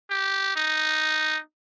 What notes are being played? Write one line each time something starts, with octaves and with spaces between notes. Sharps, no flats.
G4
D#4